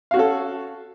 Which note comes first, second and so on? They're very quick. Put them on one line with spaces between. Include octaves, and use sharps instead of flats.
F5 F#4 C#4 A4